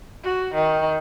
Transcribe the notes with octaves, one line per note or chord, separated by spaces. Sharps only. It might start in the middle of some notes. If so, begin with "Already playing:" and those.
F#4
D#3